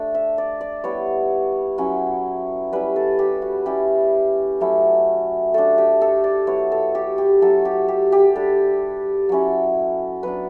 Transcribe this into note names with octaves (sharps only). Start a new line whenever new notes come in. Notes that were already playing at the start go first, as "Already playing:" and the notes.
Already playing: A3 D4
E5
D5
D5
G3 B3 E4 C#5
F#3 C#4 E4
G3 C#4 E4 B4
A4
G4
F#4
G3 C#4 E4 G4
F#3 A3 C#4 E4
A3 D4 A4
G4
A4
D5
F#3 B3 E4 C#5
A4
G4
G4
F#3 C#4 E4 A4
G4
G4
G4
G3 D4 A4
F#3 C#4 E4
F#3 B3 D4 B4